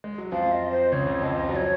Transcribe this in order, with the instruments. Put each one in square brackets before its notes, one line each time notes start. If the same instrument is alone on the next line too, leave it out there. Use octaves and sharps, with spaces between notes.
[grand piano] G#3
F#3
[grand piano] F2 F3 [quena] F5
[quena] D#5
C5
[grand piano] C#2 C#3 [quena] C#5
[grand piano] C#2 C#3
[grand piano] F2 F3 [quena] D#5
[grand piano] F3
[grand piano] F#3 [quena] D#5
[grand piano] F3 [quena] C#5